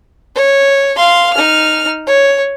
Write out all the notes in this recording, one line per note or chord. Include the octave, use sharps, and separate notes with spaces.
C#5
F5 C6
D#4 F6
C#5